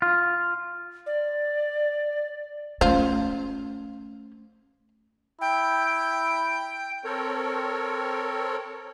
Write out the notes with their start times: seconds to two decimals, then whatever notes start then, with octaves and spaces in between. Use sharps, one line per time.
0.02 F4
1.06 D5
2.81 A3 C#4 F4 C5
5.41 E4 G5
7.04 C4 A4 A#4 C#5